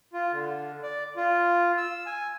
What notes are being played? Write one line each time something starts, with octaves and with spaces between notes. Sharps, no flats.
F4
D3
D5
F4
E6
G#5